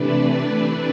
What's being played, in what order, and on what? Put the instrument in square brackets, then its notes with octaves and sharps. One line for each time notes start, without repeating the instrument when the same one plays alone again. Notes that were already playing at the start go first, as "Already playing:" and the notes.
Already playing: [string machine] C3 E3 A3 D4 B4 D5